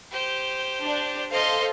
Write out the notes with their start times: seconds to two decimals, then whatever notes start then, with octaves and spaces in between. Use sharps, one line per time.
0.12 G4 C5
0.82 D4
1.32 A4 C5 D#5 F5 C6